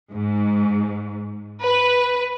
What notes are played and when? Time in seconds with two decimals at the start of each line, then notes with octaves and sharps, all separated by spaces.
0.13 G#2
1.63 B4